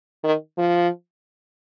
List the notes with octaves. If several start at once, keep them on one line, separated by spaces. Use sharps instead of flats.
D#3
F3